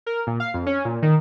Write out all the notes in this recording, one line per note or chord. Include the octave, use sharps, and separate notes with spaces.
A#4
A#2
F5
F2
C#4
A#2
D#3